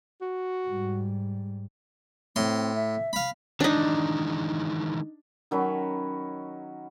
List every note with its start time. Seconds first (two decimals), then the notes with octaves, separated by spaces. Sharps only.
0.21 F#4
0.68 G#2 G3
2.36 A2 C4 C6
2.75 E5
3.13 F5 B5
3.60 D#3 E3 G#3 D4 D#4
5.51 D#3 F#3 C#4 B5